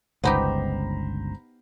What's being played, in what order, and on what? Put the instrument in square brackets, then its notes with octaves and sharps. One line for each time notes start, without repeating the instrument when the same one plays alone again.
[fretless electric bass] G1 C#2 [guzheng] B3 D#4 G4 [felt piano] C5 A#5 B5